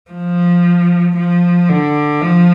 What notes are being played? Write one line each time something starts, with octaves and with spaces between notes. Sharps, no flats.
F3
F3
D3
F3